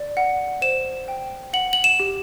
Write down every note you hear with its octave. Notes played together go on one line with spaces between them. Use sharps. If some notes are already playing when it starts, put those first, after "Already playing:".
Already playing: D5
F#5
C5 E7
G5
F#5 F#7
F#7
E7
G4